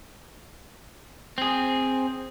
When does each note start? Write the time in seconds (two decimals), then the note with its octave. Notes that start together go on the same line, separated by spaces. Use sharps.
1.38 C4 G#4